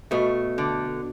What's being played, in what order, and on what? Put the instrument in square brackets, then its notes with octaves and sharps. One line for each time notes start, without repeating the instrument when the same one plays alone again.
[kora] B2 [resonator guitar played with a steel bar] A3
[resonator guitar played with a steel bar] D3